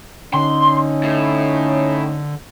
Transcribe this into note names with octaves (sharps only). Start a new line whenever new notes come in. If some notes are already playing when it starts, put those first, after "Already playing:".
D3 C#4 D#4 C6
A2